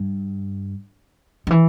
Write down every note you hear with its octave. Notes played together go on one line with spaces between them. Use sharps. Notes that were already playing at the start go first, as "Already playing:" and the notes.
Already playing: G2
D#3
E3